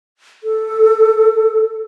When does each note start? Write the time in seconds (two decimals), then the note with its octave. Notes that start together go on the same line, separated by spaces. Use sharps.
0.44 A4